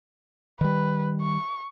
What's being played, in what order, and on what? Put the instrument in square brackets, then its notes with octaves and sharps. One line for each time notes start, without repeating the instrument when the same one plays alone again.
[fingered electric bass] D#3 G3 [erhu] B4
[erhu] C#6